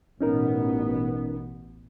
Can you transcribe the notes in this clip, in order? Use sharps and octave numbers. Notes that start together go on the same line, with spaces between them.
A1 B2 B3 C#4 D#4 A#4